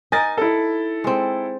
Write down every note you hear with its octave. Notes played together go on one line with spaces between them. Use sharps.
D#4 A#4 D#5 G#5 A6
E4 A4
G#3 C4